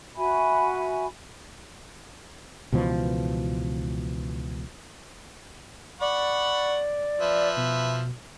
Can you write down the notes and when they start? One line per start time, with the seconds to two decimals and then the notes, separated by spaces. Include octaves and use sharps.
0.16 F#4 E5 G#5 B5
2.73 C#2 B2 E3 F3
6.01 D5 F#5 B5 C#6
7.21 F3 B4 E5
7.57 B2